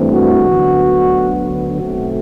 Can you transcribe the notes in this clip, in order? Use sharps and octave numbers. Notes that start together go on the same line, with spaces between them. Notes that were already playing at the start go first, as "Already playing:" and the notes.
Already playing: G2 E3 A3 C4
F#4
D2 D3 F#3 B3
B1 B2 F#3 A3 C4 F#4